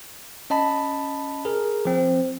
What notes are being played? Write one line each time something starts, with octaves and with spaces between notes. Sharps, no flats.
C#4 D#5 A5 B5
G#4 A#4
F3 C4